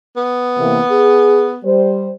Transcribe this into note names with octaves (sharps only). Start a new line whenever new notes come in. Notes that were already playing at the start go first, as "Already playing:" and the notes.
B3
C3 E3 A#3
G#4
G3 C5